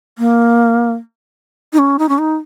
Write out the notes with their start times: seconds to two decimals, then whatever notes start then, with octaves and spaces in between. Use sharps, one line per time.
0.19 A#3
1.73 D#4
1.79 C#4
1.99 D#4
2.09 C#4
2.18 D#4